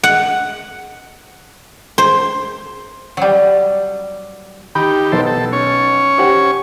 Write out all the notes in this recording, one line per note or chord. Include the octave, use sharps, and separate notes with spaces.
F#5
C5
F#3 G3
D#3 G4 B5
B1 A4 B4 C5
A4
C#4 C#5
G4 C5 F#5